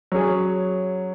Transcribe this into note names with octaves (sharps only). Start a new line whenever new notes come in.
F#3 C#4 G#4